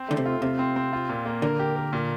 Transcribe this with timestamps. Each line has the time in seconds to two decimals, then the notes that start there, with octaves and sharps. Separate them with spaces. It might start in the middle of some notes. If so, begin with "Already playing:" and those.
Already playing: C4
0.08 D3 A3
0.17 C3
0.25 F4
0.41 C3 F4
0.59 C4
0.76 C4
0.93 F4
1.09 A#2
1.26 A#3
1.42 D3 A#4
1.59 G4
1.76 A#4
1.93 A#2